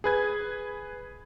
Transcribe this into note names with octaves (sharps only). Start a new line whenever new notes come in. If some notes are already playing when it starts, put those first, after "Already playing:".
G#4 B4 G#6